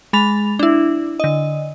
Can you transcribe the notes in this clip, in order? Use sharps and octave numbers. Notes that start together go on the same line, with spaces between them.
G#3 B5 A6 F7
D4 E4
D3 D#5